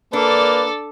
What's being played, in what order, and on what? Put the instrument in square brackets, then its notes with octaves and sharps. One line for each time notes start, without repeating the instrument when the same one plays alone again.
[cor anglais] A#3 [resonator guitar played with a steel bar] D4 [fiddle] A4 D5 [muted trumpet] B4